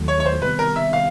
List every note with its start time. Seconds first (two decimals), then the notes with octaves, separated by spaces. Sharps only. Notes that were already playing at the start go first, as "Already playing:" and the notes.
Already playing: D#2 D#3 F#3 A3
0.08 C#5
0.20 C#5
0.26 C5
0.42 C3 D#3 G3 B3 B4
0.59 A#4
0.76 E5
0.93 F5